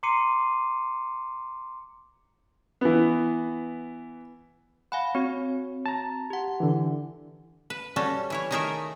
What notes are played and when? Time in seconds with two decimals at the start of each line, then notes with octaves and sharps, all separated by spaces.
0.03 A#5 C6 D6 C7 C#7 D#7
2.81 E3 B3
4.92 F5 F#5 G#5 B5
5.15 C4 F#4 C#5
5.86 A5 A#5
6.30 G4 F#5
6.60 D3 E3
7.70 B4
7.96 G3 C#4 F#4 A4
8.30 E3 E4 C#5
8.51 D#3 A3 D#4 G#4 A#4 E5